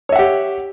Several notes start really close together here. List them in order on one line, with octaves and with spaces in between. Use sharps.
C#5 E5 F#5 G4